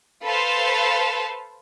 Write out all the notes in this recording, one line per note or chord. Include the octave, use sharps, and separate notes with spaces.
A4 B4 C5 F5 A5